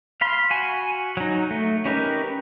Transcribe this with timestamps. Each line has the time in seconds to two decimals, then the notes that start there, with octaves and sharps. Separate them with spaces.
0.21 F5 B5 C6
0.51 F#4 G#5
1.17 F#3 D#4
1.51 A3
1.85 C#4 D#4 G4 A#4 B4